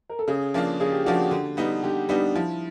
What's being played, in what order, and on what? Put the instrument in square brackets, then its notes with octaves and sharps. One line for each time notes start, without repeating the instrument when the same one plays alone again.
[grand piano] A#4
A4
[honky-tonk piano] C#3 [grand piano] G#4
[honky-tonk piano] F3 A#3 D4 F4
[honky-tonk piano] C#3 [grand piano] G#4
[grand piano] G4
[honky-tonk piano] F3 A#3 D4 F4 [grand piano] F#4
[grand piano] G4
[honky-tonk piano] D3
G3 B3 D#4
[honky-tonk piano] D3 [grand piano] G4
[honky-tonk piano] G3 B3 D#4 [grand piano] D4
[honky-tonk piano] F3 [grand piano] E4